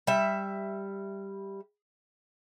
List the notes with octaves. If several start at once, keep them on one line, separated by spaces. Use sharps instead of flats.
G3 E5